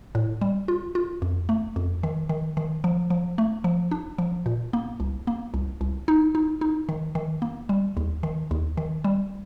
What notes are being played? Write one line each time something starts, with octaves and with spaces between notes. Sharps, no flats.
A2
G3
F4
F4
F2
A3
F2
D#3
D#3
D#3
F3
F3
A3
F3
D4
F3
A#2
A#3
C2
A#3
C2
C2
D#4
D#4
D#4
D#3
D#3
A#3
G3
D#2
D#3
D#2
D#3
G3